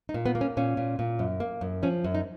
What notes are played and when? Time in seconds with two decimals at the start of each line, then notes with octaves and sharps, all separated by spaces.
0.09 D#4
0.14 A#2
0.26 B3
0.35 A#3
0.41 C#4
0.57 A#2 C#4
0.77 A#2
0.99 A#2
1.19 F#2
1.40 A#3
1.61 F#2
1.83 F3 C#4
2.04 F#2
2.15 D#4